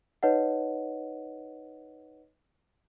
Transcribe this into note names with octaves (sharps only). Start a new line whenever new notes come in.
D#4 B4 C#5 D#5 F#5